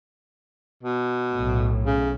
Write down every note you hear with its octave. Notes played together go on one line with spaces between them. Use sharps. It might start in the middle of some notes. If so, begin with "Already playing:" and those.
B2
B1 A2
C#3